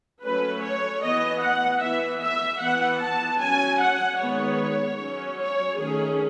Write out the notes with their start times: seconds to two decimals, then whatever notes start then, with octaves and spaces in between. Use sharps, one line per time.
0.23 F#3 A3 C#4 B4
0.63 C#5
1.03 E3 B3 D#5
1.42 F#5
1.81 E3 B3 E5
2.21 E5
2.61 E3 B3 F#5
3.01 A5
3.40 F#3 C#4 G#5
3.80 F#5
4.19 D#3 G#3 B3 C#5
4.99 F#3 C#4
5.39 C#5
5.78 D#3 A3 C#4 G#4